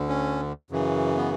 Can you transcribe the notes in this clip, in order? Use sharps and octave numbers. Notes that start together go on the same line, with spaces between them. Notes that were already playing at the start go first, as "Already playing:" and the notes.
Already playing: D2 D3
C#4
F#2 C#3 E3
B3